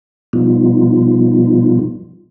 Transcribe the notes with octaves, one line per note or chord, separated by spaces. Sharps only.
B2 F3 G3 B3 D#4 F4